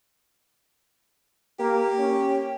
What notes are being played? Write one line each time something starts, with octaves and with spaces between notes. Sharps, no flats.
A#3 G4
C#4